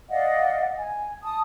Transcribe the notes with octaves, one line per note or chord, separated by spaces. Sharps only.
D5 D#5 F5 F#5
G#5
A5 D#6